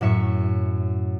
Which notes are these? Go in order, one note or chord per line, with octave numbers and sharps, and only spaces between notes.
F#2 A2 E5 C#6